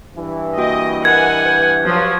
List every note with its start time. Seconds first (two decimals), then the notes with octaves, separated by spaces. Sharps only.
0.16 G2 E3
0.58 A#3 F#4 D#5 G5
1.05 A#4 D#5 F#5 G#5 B5 G#6
1.46 B4 G6
1.88 G2 F3 F#3